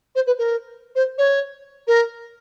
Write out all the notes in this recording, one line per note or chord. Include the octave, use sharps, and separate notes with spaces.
C5
B4
A#4
C5
C#5
A#4